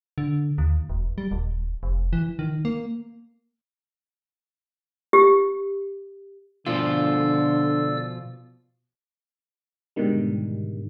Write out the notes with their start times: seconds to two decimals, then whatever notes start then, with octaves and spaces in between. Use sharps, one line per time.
0.18 D3
0.58 D#2
0.90 E1
1.18 G3
1.31 D#1
1.83 F1
2.13 E3
2.39 D#3
2.65 A#3
5.13 G4
6.66 B2 D3 F3 F4 A4 D5 E6
9.96 G#2 B2 D3 D#3 G3